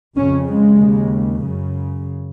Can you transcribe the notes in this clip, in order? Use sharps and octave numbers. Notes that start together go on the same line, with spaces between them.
F2 C#3 C#4
G#3
D#2 C#3
F#2 C#3